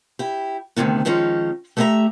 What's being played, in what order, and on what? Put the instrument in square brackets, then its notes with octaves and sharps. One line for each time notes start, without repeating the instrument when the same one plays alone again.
[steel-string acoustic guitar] E4 G4
D2 A2 C3 D#3 B3
D#3 F3 G#3 B3 C#4 D#4
A3 G4 G#4 D#5 E5 A#5